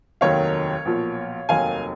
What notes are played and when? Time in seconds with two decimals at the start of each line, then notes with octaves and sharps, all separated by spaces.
0.21 F1 D#2 D#3 F#3 C#5 F5
0.85 B1 A#2 F3
1.49 F1 D#2 D#3 F#3 F5 G#5